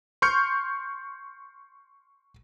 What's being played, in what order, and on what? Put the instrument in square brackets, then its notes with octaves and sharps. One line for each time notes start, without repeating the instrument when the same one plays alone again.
[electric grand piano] C6 C#6 F6 G6 C#7